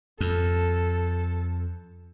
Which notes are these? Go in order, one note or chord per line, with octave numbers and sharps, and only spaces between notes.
F2 A4